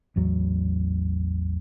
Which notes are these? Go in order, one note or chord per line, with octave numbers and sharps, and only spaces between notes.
A1 E2 F#3